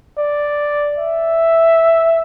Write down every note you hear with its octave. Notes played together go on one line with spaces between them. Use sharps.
D5
E5